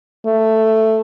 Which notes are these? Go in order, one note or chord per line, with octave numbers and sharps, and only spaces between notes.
A3